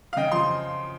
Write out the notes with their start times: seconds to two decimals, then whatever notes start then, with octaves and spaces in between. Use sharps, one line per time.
0.13 F5
0.17 C#3 D#5 G5
0.32 F3 C6